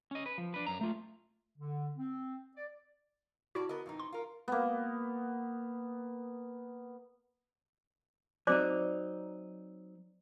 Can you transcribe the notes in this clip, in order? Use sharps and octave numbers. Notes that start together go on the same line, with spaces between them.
C#4 D#5
B4
F3
D4 B4
F#2 A#5
A3 F4
D3
C4
D5
B2 E4 F#4 D5 A5
B3 A#4 D#5
F2 B2 D#4
C6
F4 A#4
A#3 B3
F#3 C4 D#4 C5 D5 D6